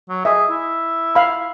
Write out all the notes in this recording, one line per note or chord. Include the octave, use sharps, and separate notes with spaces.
F#3
G#4 D#5 E5
E4
F5 B5